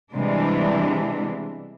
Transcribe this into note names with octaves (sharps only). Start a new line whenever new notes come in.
C3 E3 G3 G#3 B3 D4